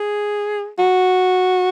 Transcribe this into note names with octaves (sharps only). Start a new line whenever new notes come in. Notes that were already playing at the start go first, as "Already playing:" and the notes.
Already playing: G#4
F#4